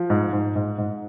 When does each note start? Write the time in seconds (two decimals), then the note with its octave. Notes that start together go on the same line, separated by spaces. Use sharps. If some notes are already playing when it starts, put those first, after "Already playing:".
Already playing: F3
0.10 G#2
0.33 G#2
0.56 G#2
0.78 G#2